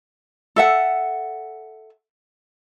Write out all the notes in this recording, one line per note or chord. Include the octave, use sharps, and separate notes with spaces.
A4 E5 F#5